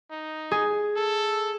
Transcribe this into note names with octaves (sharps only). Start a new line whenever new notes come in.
D#4
G#4
A4